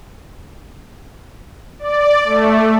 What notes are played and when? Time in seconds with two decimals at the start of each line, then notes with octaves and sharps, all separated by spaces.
1.79 D5
2.25 A3